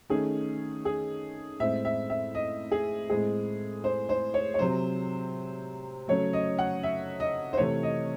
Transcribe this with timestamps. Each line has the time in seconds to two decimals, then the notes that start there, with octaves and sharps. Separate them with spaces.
0.09 D#3 A3 C#4 G#4
0.85 G#4
1.60 A2 G#3 C4 E5
1.85 E5
2.10 E5
2.35 D#5
2.71 G#4
3.09 A2 G#3 C4 G#4
3.84 C5
4.09 C5
4.34 C#5
4.54 C#5
4.59 C3 F#3 C4 C5
6.08 C#3 F#3 A3 C#5
6.33 D#5
6.58 F#5
6.83 E5
7.20 D#5
7.53 C5
7.57 C3 E3 A3 C#5
7.83 D#5